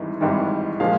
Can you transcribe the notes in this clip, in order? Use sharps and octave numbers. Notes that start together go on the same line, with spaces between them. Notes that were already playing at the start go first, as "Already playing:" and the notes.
Already playing: G#1 G#2 E3 G3
G#1 G#2 E3 G3
A#2 F3 G#3 F5